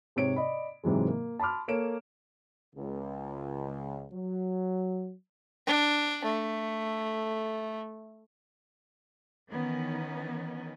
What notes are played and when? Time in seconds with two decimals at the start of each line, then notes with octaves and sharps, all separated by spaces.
0.16 G#2 C3 C#5 D7
0.36 D5 D#5 B5
0.84 G#2 C3 E3 F#3 G#3
1.08 A#3
1.39 A5 B5 C6 D6 F6
1.68 A#3 A4 C#5 D7 E7
2.76 C#2
4.12 F#3
5.67 D4
6.24 A3
9.50 D#3 E3 B3 C#4 D#4